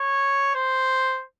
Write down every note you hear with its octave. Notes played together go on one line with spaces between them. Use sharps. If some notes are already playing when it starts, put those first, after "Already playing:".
Already playing: C#5
C5